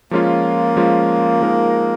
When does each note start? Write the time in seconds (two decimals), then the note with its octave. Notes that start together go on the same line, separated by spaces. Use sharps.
0.11 F3 G#3 A#3 C#4 F4
0.77 F3 G#3 C#4 F4
1.41 F3 G#3 D#4 A#4